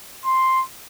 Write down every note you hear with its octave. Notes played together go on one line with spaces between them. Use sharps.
C6